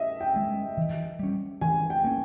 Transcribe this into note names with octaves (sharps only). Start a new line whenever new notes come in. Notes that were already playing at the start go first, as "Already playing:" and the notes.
Already playing: D#5 E5
G5
G#3 C#4
E3
G3 C#4
E3 G#5
G5
A#3 C#4